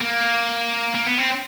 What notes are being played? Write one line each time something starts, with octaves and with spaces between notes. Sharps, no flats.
A#3
A#3
B3
C4